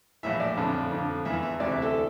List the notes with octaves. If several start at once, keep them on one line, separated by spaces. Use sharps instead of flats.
A#1 A2 E3 E5
D5
F2 D3
F2 D3
E2 E3 E5
E5
D2 C3 E3 D5
E5
A4